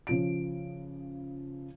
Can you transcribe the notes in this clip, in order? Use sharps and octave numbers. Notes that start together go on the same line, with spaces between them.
C#3 F3 D7